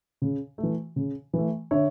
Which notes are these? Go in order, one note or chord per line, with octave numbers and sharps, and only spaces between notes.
C#3
A3
E3
C#3
E3 A3
D3 C#5 E5